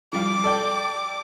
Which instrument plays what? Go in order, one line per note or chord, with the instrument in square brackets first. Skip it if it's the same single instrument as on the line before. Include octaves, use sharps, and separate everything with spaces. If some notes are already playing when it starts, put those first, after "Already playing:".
[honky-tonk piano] F3 G3 F4 [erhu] D6
[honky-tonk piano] A4 D5 G5